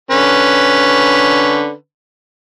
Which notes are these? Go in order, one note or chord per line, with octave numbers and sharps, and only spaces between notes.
D3 C#4 B4